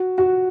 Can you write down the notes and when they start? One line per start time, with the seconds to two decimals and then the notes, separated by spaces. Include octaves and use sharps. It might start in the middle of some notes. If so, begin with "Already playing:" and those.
Already playing: F#4
0.18 F#4